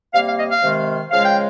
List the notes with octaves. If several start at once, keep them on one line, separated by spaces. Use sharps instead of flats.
C3 G3 A#3 F5
F5
D#5
F5
C3 D#3 G#3
C#3 F3 G#3 F5
G5